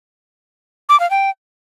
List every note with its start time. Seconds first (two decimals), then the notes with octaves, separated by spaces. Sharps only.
0.89 D6
1.00 F5
1.10 G5